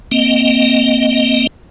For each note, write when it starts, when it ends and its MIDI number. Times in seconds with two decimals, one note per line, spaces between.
0.11 1.47 58
0.11 1.47 60
0.11 1.47 75